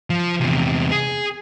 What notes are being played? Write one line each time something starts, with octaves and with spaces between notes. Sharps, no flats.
F3
E2 C3
G#4